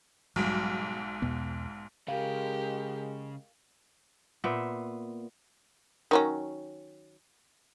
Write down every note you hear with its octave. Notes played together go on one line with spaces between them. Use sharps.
B1 G#2 F#3 G3
E2 B2 B3
C#3 G#3 G4 A#4 F5
A#2 B3 C5 E5
D#3 F#3 C#4